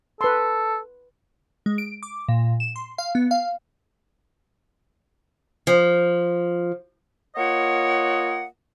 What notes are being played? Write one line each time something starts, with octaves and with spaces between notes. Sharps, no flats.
A4 B4 C6
G#3
D7
D6
A#2
E7
C6
F5
B3
F5
F3
A#3 F4 C#5 D#5 F#5